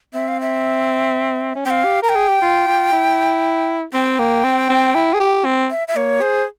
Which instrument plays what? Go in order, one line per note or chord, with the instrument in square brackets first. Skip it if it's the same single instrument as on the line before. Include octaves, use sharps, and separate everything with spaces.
[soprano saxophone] C4 [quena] E5
[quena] F5
E5
[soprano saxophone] C#4
[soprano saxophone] C4 [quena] F5 G5
[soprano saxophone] G4
[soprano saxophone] A#4 [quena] A#5
[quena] G5
[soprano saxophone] G#4
G4
F4
F4
E4
[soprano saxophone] C4 [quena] G5
[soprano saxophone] A#3
C4
C4
E4
G#4
G4
C4
[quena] E5
E5
[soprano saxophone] A#3 [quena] C#5
[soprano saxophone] G#4 [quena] C5